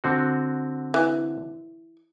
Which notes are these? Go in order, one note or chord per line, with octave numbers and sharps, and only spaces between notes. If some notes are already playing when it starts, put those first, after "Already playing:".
D3 C4 F#4
E3